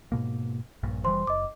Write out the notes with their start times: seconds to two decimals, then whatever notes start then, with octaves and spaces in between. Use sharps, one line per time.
0.12 G#2 B2 A#3
0.83 A#1 G2 A#2
1.04 F1 E3 G3 C5 C6
1.27 F#1 D#5 D6